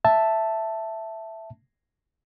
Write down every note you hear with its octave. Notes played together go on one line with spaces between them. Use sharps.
E5 A5